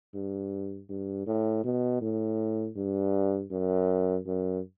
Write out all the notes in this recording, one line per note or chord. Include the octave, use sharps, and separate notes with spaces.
G2
G2
A2
B2
A2
G2
F#2
F#2